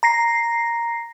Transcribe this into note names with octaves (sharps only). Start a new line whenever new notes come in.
A#5 A#6 C7